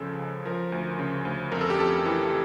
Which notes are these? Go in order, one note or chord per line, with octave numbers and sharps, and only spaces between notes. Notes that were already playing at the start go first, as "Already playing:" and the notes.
Already playing: C#2 C#3 F3 A4
C#2
F3 A#4
D2
C#3
D2
F2 A#4
A4
G4
F2 A4
E3